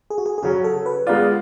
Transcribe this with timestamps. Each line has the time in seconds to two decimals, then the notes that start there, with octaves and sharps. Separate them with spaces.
0.11 G#4
0.18 F#4
0.26 G#4
0.38 G#4
0.43 C#3 F#3 C#4 F#4
0.64 A4
0.86 B4
1.07 G#3 B3 F4 D5